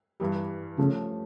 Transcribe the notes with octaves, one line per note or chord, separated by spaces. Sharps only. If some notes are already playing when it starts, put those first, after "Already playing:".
G2 E3 G3
C#3 F3 A3 C#4